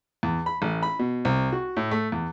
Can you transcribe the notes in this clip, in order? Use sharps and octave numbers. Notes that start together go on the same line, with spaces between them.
E2
B5
A1
B5
B2
C2
F#4
A2
A3
E2